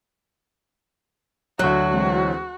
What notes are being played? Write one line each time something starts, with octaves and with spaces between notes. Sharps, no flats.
D2 F#3 F#4 F#6
E3 G#3 C4